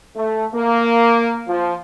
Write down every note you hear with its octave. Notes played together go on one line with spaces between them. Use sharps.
A3
A#3
F3